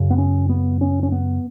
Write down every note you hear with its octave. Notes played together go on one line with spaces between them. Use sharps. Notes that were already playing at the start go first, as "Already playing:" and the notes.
Already playing: F#2 C#3
B3
C#4
B3
C#4
C#4
B3